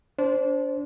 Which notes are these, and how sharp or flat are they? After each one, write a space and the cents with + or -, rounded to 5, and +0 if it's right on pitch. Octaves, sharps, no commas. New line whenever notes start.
D4 -30 C5 +0